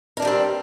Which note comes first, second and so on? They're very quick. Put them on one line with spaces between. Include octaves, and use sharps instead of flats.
A#4 D4 A#3 G3 C4